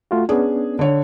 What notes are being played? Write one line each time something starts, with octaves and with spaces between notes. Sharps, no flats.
A3 F4 F#4
B3 C#4 D4 G#4
D3 C#5